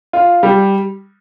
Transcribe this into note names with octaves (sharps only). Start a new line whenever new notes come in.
F4
G3